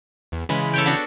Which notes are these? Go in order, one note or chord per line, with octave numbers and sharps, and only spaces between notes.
E2
C#3 E3 G#3 B5
A4 C#5 G5
B3 D4 F#4